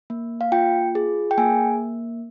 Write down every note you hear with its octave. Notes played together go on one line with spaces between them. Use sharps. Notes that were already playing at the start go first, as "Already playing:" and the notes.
A#3
F5
F4 G5
G#4
G5
A#3 G#5